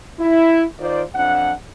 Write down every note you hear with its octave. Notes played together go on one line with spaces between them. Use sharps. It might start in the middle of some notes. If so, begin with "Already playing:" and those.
E4
D#3 F4 C5 D5
F2 F3 D4 F#5